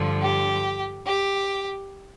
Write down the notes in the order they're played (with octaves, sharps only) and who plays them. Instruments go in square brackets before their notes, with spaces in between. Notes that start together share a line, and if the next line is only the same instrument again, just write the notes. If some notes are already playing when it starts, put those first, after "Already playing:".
Already playing: [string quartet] G2 D3 F3
G4
G4